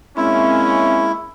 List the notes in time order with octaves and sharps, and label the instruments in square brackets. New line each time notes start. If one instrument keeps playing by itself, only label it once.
[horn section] G#3 A#3 C#4 [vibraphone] C4 E5 [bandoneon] E4